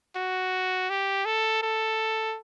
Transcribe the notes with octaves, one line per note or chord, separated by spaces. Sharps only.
F#4
G4
A4
A4